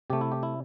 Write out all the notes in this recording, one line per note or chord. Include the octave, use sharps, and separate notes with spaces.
C3 A3 G4
E4
G4
E4